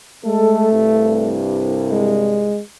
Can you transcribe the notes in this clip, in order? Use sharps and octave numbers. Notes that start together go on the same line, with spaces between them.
G#3 A3 A4
C2 G2
G#3